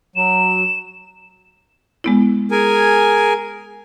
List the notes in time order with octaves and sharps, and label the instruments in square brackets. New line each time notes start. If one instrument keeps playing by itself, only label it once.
[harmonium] F#3 [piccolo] E7
[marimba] G#3 B3 E4
[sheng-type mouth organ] G#4 A#4 G#5